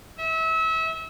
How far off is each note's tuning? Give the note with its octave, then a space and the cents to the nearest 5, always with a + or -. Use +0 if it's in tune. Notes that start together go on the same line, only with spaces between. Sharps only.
E5 -30